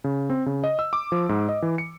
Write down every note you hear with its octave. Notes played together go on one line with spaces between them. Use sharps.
C#3
C4
C#3
D#5
E6
D6
F3
G#2
D#5
E3
C#7